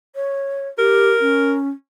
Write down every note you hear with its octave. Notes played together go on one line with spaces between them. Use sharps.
C#5
G4 A#4
C#4